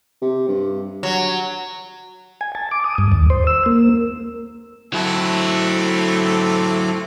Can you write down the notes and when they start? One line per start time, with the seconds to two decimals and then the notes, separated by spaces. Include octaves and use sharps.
0.22 C3
0.48 G2
1.03 F#3
2.41 G#5
2.55 A5
2.71 D6
2.84 D#6
2.98 G2
3.12 D#2
3.30 C5
3.47 E6
3.66 A#3
4.93 F#3 A3 C4 E4 A4